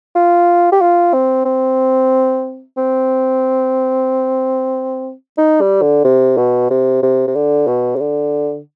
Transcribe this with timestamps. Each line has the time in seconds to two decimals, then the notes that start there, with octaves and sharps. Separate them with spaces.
0.15 F4
0.72 G4
0.81 F4
1.13 C4
1.45 C4
2.77 C4
5.38 D#4
5.61 G3
5.82 D3
6.04 C3
6.37 B2
6.70 C3
7.02 C3
7.27 C3
7.36 D3
7.67 B2
7.96 C3
8.01 D3